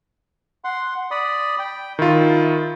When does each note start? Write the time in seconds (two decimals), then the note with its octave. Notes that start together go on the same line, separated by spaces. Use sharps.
0.64 F#5 C6
1.11 D5 B5 D#6
1.59 G5
1.99 D#3 E4 F4